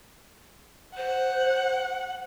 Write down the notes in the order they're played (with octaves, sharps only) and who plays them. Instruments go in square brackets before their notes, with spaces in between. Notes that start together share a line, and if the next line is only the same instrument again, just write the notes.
[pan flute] C5 [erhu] F#5